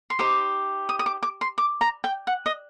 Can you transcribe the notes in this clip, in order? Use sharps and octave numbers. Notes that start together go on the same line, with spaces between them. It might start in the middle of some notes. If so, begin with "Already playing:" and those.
C6
D#4 G4 C5 D6
D#6
D#6
D6
D6
C6
D6
A#5
G5
F#5
D#5